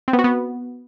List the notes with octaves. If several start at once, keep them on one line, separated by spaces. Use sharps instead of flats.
C4
B3
F#4
B3